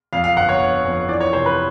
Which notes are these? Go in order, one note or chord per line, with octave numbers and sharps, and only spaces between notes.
F2 F5
F5
G1 F#5
C#5
G1
F2
E3 D5
C#5
C3 C5
B4